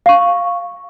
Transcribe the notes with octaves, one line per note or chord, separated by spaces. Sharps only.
F5 C#6